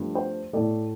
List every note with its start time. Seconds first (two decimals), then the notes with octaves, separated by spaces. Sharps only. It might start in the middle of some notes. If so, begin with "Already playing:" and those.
Already playing: G2 F3 A3
0.15 C5
0.53 A2 A3 D5